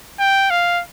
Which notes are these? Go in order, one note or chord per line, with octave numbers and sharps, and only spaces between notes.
G5
F5